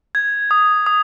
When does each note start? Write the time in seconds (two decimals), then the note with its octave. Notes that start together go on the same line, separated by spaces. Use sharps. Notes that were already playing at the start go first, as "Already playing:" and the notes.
0.15 G#6
0.51 D#6
0.86 D#6